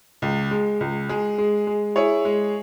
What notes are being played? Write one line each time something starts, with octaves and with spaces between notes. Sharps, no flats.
C#2
G#3
C#2
G#3 G#4
G#3
G#3
E4 G#4 C#5
G#3